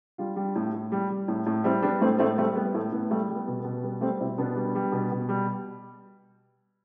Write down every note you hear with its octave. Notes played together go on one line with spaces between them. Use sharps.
G3 D4 F4
G3
A2
A2
G3
G3
A2
A2
G3 C4 E4
G3 B3 D4
A2 A3 C4
A2 A3 C4
G3 A3 C4
G3 B3
A2 A3
A2 B3
G3 A3
G3
B3
B2
B3
B2
G3 B3
G3 A3 C4
B2 C4 E4
B2 B3 D4
G3
G3
B2
B2
G3